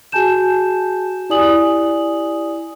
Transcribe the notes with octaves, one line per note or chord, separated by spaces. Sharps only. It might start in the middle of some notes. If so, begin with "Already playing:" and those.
F#4 G#4 G#5 A5 G6 E7
E4 G4 D5 G#5 D#6 F#7